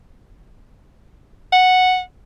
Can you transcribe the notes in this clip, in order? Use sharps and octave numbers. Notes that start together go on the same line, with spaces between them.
F#5